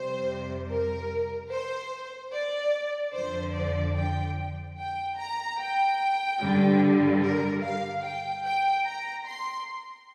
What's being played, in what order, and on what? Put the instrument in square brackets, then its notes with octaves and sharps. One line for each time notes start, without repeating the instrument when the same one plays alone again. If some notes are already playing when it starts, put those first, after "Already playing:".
Already playing: [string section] F2 C3 G3 C5
A#4
C5
D5
F2 D3 F3 C5
D5
G5
G5
A#5
G5
G2 D3 G3
A#4
F5
G5
G5
A#5
C6